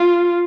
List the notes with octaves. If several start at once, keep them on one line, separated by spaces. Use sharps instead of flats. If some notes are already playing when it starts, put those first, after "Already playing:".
Already playing: F4